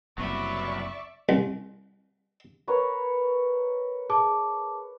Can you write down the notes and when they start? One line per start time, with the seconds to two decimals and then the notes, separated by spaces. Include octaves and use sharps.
0.18 F#1 C2 F#3 B4 D5 E5 C#6
1.29 C2
2.67 A#4 B4 C#5
4.10 G#4 A5 D6